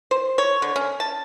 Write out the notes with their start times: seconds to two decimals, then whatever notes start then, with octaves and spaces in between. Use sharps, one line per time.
0.11 C5
0.38 C#5
0.62 D3
0.76 C#4
1.00 A5